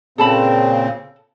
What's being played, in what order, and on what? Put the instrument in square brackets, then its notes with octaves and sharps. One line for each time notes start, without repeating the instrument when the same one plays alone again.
[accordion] A#2 C#3 C4 [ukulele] A4 A5 B5